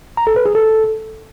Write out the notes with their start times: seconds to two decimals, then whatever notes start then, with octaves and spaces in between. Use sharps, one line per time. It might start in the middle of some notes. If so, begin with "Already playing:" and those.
0.17 A#5
0.27 A4
0.36 B4
0.46 G#4
0.55 A4